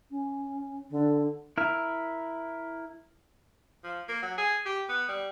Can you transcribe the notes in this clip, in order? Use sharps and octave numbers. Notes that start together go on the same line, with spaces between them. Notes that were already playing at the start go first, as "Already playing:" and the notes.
C#4
D3
E4 A#4
F3
A#3
F#3
G#4
G4
B3
G3